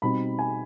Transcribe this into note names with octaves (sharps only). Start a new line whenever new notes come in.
B2 G3 C4 D#4 B5
G#5